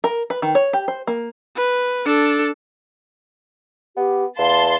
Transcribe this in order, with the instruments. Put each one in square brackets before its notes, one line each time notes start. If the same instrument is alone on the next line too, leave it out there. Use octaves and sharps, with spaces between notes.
[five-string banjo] A#4
B4
D#3
C#5
G4
C5
A#3
[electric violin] B4
D4 A4
[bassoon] B3 [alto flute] G4
[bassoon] E2 [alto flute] F5 [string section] A5 C6